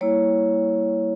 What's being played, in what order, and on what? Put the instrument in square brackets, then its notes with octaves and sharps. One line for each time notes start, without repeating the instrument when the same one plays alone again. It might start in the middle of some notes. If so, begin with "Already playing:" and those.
[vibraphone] G3 A#3 E4 C#5